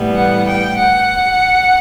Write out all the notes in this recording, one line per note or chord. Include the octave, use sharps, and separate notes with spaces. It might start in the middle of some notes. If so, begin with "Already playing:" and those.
Already playing: A2 E3 G3 B3
F#5
G5
F#5